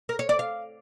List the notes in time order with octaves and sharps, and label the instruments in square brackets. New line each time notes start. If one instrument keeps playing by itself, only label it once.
[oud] A#4
C#5
D5
F5